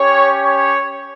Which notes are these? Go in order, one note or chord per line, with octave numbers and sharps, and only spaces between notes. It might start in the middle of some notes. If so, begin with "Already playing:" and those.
Already playing: C#4 G4 C#5
C#5